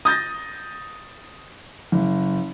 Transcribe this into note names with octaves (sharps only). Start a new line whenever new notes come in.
D#6 G6 A6 A#6
F#1